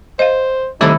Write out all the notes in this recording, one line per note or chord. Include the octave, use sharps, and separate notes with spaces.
C5 D#5 F5
C3 D#3 G3 A3 D#4 E4 A4